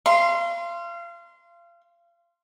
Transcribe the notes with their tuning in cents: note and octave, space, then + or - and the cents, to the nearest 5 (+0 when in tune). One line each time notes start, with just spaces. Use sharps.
F5 -30 C6 +0